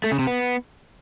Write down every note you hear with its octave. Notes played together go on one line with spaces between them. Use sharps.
A3
C#3
C3
B3